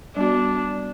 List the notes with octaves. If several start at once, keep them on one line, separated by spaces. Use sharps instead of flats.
G3 B3 D4 F#4